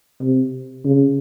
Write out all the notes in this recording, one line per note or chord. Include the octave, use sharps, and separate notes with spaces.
C3
C#3